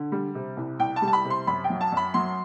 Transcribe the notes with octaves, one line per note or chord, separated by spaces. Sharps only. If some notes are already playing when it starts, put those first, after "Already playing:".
Already playing: D3
G3
C3
C2
C2 G5
A5
G3
A5
B5
C3
C6
F#2 B5
G5
F#3
A5
F#2
B5
F#3 C6